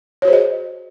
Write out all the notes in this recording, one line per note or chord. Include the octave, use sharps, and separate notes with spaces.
F#4 G#4 C5 C#5 D#5